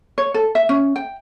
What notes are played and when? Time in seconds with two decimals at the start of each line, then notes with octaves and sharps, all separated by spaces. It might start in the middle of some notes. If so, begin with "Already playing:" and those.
0.18 C#5
0.34 A4
0.55 E5
0.69 C#4
0.96 G5